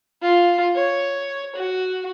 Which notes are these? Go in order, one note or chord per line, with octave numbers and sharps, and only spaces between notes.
F4
C#5
F#4